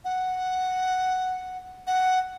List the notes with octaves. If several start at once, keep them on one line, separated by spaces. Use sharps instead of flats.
F#5
F#5